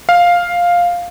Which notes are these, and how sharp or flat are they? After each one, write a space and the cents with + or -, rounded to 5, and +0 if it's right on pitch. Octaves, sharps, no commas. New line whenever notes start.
F5 +5